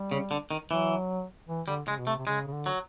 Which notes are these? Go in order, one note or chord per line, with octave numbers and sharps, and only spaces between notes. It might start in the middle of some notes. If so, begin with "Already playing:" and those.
Already playing: G3
C#3
D3
D#3
E3 F#3
E3
D3 G3
C#3 G#3
B2
C3 A3
C3
C#3 G#3
C#3
D3
F#3